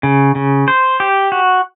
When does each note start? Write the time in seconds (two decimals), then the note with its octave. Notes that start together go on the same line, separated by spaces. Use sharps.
0.03 C#3
0.35 C#3
0.68 C5
1.00 G4
1.32 F#4